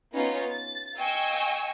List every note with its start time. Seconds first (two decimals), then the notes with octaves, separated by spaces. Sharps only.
0.12 B3 C#4 D#4 F4
0.50 A6
0.97 D#5 F5 G5 G#5 C#6 E6